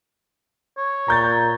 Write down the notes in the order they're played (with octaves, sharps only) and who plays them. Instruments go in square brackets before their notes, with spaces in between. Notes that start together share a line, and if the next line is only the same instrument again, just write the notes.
[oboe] C#5
[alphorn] A#2 [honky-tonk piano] A#5 G6 A6